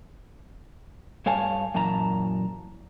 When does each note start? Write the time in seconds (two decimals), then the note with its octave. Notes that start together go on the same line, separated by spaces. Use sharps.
1.26 G2 A4 C#5 F5 G#5 A5
1.75 F#2 A#2 E3 A5 A#5